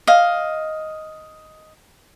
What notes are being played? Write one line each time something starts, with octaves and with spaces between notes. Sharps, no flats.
D#5 F5